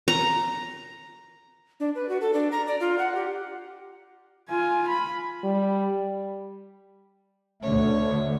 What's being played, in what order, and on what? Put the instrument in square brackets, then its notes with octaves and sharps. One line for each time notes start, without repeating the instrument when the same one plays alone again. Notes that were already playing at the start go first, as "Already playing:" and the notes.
[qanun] A#5
[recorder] D4
B4
F#4
A4
D4
A#5
D5
F4
F#5
G4
[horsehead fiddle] F4 G#5
B5
[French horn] G3
[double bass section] D2 D3 [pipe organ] A3 [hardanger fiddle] C#5